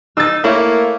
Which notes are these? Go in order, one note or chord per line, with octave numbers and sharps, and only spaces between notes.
D#4 E6 A6
A3 A#3 E4 C#5